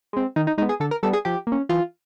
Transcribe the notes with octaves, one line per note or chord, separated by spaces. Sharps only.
G#3 C4
D#3 D#4
D#4
G#3 B3 D#4
G#4
D3 A4
A#4
G3 B3 D4 A4
G#4
F3 G4
A#3
C#4
E3 F4